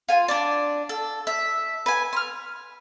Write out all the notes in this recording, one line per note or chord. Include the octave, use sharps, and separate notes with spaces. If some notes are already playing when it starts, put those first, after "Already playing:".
F4 G#5
D4 D5
A4
E5
B4 G#5
C6 F6